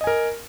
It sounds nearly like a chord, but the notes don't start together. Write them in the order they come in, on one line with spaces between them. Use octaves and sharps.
D#5 G#5 A#4